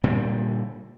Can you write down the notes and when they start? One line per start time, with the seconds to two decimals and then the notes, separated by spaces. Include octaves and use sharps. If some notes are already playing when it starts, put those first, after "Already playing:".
0.04 A#2 D3 G3